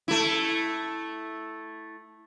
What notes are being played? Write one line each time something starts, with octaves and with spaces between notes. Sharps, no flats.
A3 E4